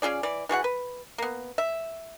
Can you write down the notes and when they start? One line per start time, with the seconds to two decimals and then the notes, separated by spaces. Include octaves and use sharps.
0.02 C#4 F4 G#4 D5
0.23 E3 D5
0.49 E3 F#4 G#4 F#5
0.64 B4
1.18 A#3 B3
1.58 E5